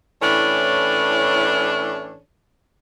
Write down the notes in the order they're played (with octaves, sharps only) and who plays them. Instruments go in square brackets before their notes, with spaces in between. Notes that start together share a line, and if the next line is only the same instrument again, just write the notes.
[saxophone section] A2 E3 C#4 D4 A4 C#5